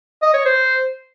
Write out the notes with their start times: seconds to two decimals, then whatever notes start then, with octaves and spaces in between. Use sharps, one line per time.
0.22 D#5
0.34 C#5
0.45 C5